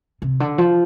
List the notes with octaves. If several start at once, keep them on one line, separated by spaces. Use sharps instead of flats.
C3
D3
F3